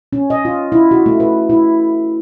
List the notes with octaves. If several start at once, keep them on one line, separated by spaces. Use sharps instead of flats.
C#4
D#5
F4
E4
F#4
A3
B4
E4